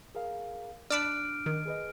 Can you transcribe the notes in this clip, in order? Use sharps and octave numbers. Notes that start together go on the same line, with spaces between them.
G#4 A#4 F5
D4 D5 A5 B5 D6 F6 F#6 D7
D#3
G#4 B4 D#5